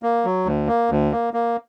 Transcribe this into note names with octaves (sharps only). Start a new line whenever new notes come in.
A#3
F#3
D2
A#3
D2
A#3
A#3